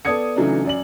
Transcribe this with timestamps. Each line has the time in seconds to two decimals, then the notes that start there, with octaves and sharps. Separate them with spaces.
0.05 B3 A4 D5 D#6 G#6 C#7
0.36 C#3 E3 F#3 A3 D4 D#4
0.65 F#2 D5 F#7